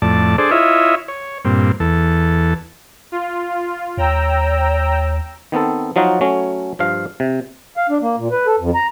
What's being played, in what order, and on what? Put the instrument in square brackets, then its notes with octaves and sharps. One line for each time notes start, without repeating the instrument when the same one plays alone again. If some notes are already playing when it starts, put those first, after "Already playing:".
[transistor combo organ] F2 A2 D5 A5
D4 G#4 A4 C5 D5
E4 F4 C#5 D#5 E5
C#5
G2 A#2 C4
E2 A4
[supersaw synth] F4
[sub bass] D#2 [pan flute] C#5 [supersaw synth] G5 A#5 E6
[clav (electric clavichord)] D#3 B3 C4 A4
F3 F#3 D#4 F4 F#4
F#3 A3 C#4
G2 F3 F5
C3
[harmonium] F5
D4
A#3
A#2
B4
A4
F2
A#5